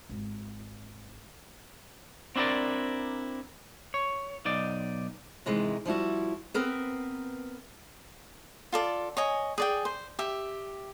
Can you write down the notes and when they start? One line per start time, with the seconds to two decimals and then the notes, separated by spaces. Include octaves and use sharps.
0.09 G#1
2.36 C4 D4 E4 F4 A#4 D5
3.94 C#5
4.45 B1 D#4 D5
5.46 C3 D#3 E3 G#3
5.85 F3 G3 E4 F#4
6.54 B3 C4 A#4 B4
8.72 F4 A4 D5
9.17 C#5 D#5 G#5
9.58 G#4 D5 G5
9.85 C5
10.19 G4 E5